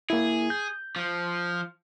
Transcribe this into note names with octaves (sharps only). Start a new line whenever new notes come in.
A#3 E4 G#4
G6
F3